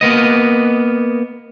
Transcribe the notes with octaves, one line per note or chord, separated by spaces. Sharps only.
A#3 B3 D#5